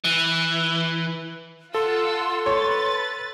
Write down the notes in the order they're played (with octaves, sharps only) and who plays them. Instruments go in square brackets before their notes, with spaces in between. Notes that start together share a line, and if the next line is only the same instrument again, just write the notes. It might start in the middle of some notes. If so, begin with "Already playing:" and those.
[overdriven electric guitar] E3
[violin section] F4 F#5 E6 [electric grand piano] A4 [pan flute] C6
[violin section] B4 A6 [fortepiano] C#5